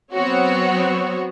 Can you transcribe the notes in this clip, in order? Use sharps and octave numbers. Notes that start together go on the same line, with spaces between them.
F#3 B3 C4 F#4 C#5